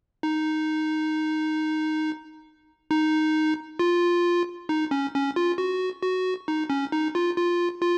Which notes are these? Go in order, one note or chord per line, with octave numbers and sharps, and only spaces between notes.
D#4
D#4
F4
D#4
C#4
C#4
F4
F#4
F#4
D#4
C#4
D#4
F4
F4
F4